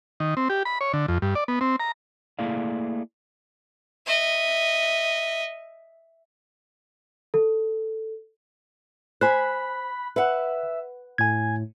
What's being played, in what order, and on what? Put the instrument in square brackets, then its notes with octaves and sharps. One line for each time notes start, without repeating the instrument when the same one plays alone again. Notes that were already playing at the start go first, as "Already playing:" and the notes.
[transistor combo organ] D#3
C4
G4
B5
C#5
D3
F2
G2
D5
B3
C4
A#5
[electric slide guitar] A3 A#3 E4 G#4 D5 F5
[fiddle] D#5 E5
[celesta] A4
[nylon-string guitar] C5 G#5 [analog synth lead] B5 [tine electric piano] F#6
[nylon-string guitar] B4 F#5 [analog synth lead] E5
[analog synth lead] A2 [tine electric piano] G#5 G#6